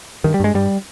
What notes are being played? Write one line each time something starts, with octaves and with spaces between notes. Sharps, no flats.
G2 D#3
G3
G2 G#3
G2 G3